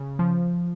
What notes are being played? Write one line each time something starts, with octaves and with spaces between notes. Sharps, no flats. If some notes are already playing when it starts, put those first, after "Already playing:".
Already playing: C#3
F3